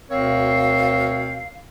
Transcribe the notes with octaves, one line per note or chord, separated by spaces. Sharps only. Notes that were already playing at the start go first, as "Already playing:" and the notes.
D2 B2 C4 A#4 C#5 F5